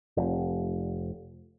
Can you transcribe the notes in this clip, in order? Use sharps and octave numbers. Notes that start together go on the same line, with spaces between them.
F1